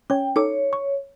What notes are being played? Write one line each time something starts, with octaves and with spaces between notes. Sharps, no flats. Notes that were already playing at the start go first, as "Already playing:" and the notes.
C#4 C#5 G5
D#4 A4 C#5 D6
C#6